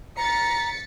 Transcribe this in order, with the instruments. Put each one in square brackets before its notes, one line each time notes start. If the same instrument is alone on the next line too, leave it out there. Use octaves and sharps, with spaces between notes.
[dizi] A#5 [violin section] A6 B6 C#7